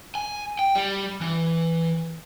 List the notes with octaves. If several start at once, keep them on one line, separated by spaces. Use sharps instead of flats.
G#5
G5
G3
E3